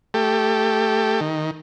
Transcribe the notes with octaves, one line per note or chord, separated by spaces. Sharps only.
A3 G4
D#3